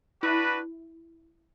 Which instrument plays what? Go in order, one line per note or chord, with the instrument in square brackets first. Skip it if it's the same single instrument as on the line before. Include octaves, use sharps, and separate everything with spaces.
[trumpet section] D4 F#4 B4 [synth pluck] E4